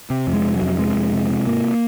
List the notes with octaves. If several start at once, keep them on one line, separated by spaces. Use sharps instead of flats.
C3
F2
G#3
C3
F#3
F2
C3 G#3
F2
C3
C3
G#2 A#3